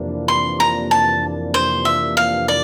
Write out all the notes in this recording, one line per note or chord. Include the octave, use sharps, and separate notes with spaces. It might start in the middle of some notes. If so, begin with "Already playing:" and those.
Already playing: F2 C3 E3 A#3 D4
C6
A#5
A5
C5
E5
F5
D5